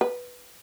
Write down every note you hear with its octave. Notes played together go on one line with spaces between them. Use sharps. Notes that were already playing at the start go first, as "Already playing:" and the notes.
B4